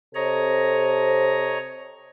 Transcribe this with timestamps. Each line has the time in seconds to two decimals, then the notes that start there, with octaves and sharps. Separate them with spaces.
0.14 C3 A4 C5 C#5 D#5 A#5